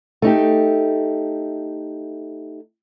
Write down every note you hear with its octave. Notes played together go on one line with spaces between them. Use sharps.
A3 D#4 G4